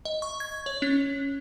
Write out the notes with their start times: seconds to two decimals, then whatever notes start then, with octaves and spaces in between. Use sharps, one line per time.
0.05 D#5
0.22 C#6
0.40 G#6
0.66 C#5
0.82 C#4